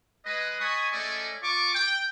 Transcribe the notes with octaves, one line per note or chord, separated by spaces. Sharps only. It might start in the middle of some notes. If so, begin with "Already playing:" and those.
G#3 B4 D#5
D#5 G#5 A5 B5 C#6 D#6
G#3 A3 C#4 A4 D5 D#5
F4 C#6 D6
G5